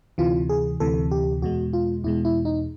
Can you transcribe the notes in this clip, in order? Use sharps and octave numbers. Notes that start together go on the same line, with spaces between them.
D2 C3 E3 F4
G#4
D2 C3 E3 A4
G4
E2 B2 G#3 F#4
F4
E2 B2 G#3 E4
E4
D#4